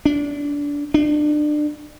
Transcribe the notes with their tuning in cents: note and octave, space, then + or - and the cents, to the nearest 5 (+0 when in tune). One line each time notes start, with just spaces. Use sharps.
D4 -25
D4 +30